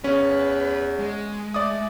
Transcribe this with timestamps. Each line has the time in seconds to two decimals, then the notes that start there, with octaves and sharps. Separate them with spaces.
0.04 E2 C#4 B4
0.99 G#3
1.54 A3 D5 D#6